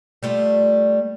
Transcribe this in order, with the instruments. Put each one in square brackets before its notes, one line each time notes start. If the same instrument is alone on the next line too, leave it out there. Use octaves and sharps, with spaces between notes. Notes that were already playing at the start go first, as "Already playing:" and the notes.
[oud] G3 A3 F4